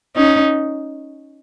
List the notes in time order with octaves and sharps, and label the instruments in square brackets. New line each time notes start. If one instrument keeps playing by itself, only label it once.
[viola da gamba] C#4 D#4